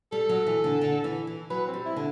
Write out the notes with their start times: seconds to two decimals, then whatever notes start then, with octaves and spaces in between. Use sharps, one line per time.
0.12 G3 A4
0.29 F#3
0.47 E3
0.64 D3
0.81 D3
1.04 E3
1.27 E3
1.50 F#3 B4
1.67 C4
1.74 G3
1.85 E4
1.96 D3